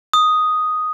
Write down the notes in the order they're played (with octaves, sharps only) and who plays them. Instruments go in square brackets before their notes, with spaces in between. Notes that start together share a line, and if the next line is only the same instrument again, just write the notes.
[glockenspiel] D#6